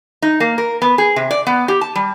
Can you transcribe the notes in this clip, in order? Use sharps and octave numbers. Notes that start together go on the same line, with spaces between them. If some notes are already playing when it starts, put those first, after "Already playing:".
D#4
A#3
A#4
B3
G#4
C3
D5
B3
G4
A5
G3